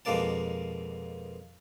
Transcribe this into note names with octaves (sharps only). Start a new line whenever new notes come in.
F2 B2 G#3 A#3 D5 A5